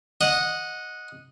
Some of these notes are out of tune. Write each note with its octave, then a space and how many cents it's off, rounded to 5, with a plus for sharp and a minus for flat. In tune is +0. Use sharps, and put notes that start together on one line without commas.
D#5 +0 F#5 -15